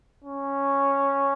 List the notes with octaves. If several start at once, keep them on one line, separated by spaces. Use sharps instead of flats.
C#4